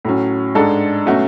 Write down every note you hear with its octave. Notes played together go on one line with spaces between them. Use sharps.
A2 F#3 C#4
G#2 G#3 D4 A4
B2 F#3 A3 C#4 F#4